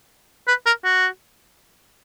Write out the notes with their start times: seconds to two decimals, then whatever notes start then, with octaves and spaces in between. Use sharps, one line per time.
0.48 B4
0.66 A#4
0.84 F#4